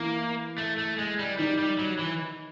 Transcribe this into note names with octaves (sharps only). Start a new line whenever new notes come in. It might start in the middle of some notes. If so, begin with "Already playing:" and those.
Already playing: E3 A#3 E4
A3
A3
G#3
G3
D#3 G3 D#4
G3
F#3
E3